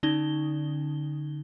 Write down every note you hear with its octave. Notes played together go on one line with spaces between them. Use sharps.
D3 C#4 D#4 G7